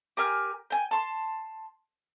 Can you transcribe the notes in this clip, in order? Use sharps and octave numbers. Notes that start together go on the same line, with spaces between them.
G4 A#4 G#5 F6
G5 G#5
A5 C6